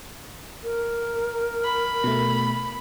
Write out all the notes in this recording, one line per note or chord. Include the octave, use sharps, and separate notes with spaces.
A#4
B5
B2 A3